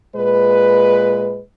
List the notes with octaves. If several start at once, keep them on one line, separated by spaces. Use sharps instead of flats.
A#2 G#3 B4